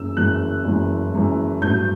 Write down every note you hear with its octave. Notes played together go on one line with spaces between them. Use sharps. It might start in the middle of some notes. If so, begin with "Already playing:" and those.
Already playing: F#1 F#2 E3 E6
F#1 F#2 E3 F#6
F#1 F#2 E3
F#1 F#2 E3
A1 G2 F#3 G6